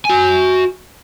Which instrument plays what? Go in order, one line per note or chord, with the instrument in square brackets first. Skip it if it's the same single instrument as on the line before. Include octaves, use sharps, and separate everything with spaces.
[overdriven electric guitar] F#4 G#5